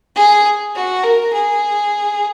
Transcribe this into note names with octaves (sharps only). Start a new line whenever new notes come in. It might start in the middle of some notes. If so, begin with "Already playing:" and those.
G#4
F#4
A#4
G#4